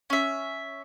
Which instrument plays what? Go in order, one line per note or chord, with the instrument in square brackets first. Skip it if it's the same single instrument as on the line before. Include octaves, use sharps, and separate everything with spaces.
[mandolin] C#4 E5